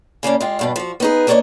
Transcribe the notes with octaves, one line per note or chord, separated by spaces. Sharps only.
C#3 A#3 C#4 D4
G#3 F4 G4
G2 B2 D4
F3 F#4
B3 D#4 G#4
A#3 B3 D4 A4 C#5 D#5